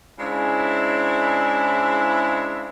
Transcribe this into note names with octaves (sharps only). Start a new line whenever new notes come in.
C#3 G#3 C4 D4 E4